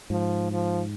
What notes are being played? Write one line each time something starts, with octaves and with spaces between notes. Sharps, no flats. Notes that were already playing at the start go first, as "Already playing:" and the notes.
G#2 F3
F3